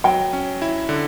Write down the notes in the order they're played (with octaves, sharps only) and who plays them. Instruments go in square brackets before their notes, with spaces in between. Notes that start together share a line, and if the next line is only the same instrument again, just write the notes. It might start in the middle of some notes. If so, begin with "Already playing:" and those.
[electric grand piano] F#3 [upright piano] G5
[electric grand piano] C#4
E4
D3